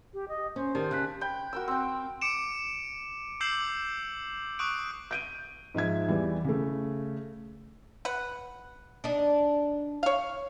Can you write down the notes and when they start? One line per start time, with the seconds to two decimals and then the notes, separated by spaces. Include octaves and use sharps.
0.14 G4
0.28 D#5
0.56 C#4 C5
0.75 D#3 G4 D5 A5
0.91 C#3 A5 F#6 B6
1.21 G5 B5
1.53 F#4 A#4 E6
1.68 C4 G5
2.21 D6 C#7 D7 E7
3.41 D6 E6 G6 C7 E7 F#7
4.59 C#6 D#6 F#6 D7
5.11 G6 D7 D#7
5.74 G#2 F3 E5 G#6
6.08 E2 E3 G3
6.44 C#3 A3
8.05 B4 F#5
9.04 D4 D#4
10.03 C#5 F5